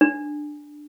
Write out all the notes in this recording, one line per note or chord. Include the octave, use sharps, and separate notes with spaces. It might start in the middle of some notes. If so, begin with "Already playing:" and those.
D4